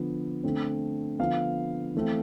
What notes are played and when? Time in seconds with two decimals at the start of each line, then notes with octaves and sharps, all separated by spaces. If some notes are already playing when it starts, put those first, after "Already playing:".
Already playing: D3 F3 B3
0.43 D3 A3 C4
1.19 D3 F3 B3 F5
1.95 E3 A3 C4